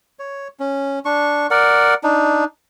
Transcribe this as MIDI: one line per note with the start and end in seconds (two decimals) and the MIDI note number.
0.19 0.48 73
0.60 0.99 61
1.05 1.47 62
1.05 1.47 85
1.51 1.94 70
1.51 1.94 74
1.51 1.94 78
2.03 2.44 62
2.03 2.44 63